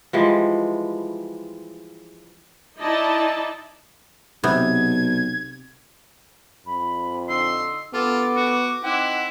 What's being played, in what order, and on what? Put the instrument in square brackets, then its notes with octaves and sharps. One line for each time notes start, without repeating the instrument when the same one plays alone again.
[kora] E3 F3 G3 G#3
[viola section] D#4 E4 D5 D#5 A5
[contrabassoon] B1 [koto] C3 B3 [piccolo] G#6
[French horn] F2 [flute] B5
[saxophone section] D3 D#4 [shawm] C6 [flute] E6
[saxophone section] G2 A4 [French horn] B3 [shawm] F4 [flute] D6
[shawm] F#4
[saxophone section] C4 F#5 [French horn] D#4 [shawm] E4